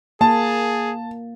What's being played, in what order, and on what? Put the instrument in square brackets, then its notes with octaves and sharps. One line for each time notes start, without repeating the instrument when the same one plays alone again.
[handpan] A#3 [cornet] G#4 [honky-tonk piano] A5